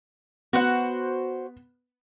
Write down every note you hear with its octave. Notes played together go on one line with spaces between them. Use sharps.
B3 F#4 C5 F#5